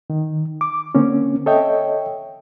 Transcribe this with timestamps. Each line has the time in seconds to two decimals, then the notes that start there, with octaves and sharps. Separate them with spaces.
0.10 D#3
0.61 D6
0.95 D3 A#3 C4 C#4
1.46 A4 C#5 D#5 E5 G5